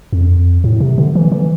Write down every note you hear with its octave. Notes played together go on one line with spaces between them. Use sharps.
F2
A2
C3
D3
E3
E3